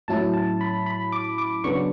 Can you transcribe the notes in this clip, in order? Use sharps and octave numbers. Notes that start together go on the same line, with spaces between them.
A2 F#3 C#4 E4 A5
A5
B5
B5
D6
D6
C#3 F#3 B3 D4 C#6